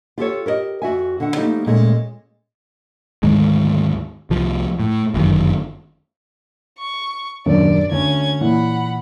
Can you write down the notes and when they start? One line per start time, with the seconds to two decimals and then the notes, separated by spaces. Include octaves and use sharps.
0.18 F4 G4 A4 C#5
0.46 G4 A#4 D5 D#5
0.82 F2 F#4 E5 G#5
1.20 D3 F#5
1.36 F3 G3 A3 A#3 D#4
1.66 A#2 G#3 A3 C#4
3.23 D2 G#2 D#3 G#3
4.30 C2 F3
4.79 A2
5.14 G1 F#2 A2 D#3
6.79 C#6
7.46 D#1 F#2 D4 D5
7.92 D2 C#4 G#6
8.41 A#2 E3 F#5 B5